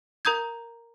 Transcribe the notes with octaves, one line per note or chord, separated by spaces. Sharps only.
A#4 A#5 D#6 G6 G#6